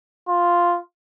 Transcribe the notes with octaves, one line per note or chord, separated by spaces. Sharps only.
F4